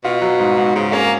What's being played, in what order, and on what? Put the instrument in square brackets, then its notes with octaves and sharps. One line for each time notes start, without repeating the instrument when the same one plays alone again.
[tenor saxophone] B2 [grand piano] F4
[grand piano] F#3
G#2
G#2
[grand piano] G#2 [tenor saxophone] C#3
[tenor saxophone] A#3 [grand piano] C#4